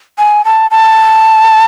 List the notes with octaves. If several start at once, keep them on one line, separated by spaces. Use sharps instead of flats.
G#5
A5
A5